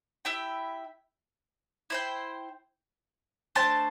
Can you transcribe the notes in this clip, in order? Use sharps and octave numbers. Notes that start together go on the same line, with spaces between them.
E4 G4 E5 G5
E4 C5 G5
A3 D4 C5 A5